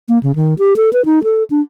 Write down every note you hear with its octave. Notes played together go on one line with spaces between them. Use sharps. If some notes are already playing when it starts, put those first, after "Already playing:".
A#3
C#3
D#3
G4
A4
B4
D#4
A4
D4